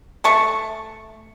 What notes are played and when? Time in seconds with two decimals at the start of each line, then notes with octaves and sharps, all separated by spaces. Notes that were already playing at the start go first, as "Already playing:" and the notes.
0.24 A3 A5 C#6